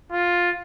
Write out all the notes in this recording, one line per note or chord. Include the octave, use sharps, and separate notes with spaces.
F4